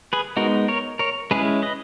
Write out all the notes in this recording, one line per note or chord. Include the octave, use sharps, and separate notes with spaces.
G#4 B4
G#3 B3 D#4 F#4 A#4
A#4 C#5
A#4 C#5
G#3 C#4 E4 G#4 B4
B4 D#5